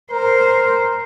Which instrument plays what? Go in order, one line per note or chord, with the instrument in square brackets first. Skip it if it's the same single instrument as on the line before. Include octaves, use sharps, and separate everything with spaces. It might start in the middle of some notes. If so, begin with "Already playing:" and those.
[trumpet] A#4 [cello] C5